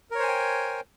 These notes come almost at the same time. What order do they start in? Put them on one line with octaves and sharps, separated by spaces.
A#4 C#5 C5 G#5 G5